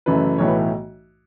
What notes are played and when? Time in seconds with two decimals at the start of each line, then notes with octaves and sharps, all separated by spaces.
0.06 F#1 F#2 E3 A3 B4
0.38 B1 A2 E3 A3 C#5
0.48 B4